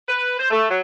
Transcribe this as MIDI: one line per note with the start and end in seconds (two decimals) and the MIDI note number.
0.08 0.36 71
0.38 0.47 72
0.51 0.65 57
0.70 0.80 54